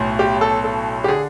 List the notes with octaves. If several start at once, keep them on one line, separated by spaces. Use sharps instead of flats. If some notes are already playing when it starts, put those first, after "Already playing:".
Already playing: B1 A2
G4
A4
A4
G4
D3 G#4